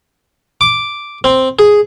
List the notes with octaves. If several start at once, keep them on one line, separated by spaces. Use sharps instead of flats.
D6
C4
G#4